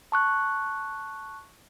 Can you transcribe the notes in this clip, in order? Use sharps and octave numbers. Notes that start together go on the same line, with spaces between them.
A5 C#6 F#6